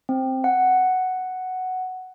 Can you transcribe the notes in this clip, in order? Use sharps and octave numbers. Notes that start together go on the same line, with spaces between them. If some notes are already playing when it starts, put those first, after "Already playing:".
C4
F#5